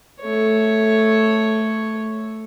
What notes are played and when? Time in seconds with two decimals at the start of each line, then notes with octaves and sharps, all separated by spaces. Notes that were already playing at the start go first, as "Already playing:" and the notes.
0.21 A3 C#5